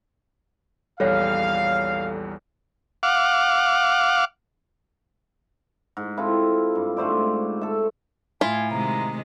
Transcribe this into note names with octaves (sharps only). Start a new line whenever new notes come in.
A#1 E2 G3 A4 C#5 F5
F5 F#5 D6
G#2
C4 E4 F4 A4
G2
G#2 A3 C5 D5
A4 E5
A2 E4 F4 G#5
C3 D#3 G#3 A#5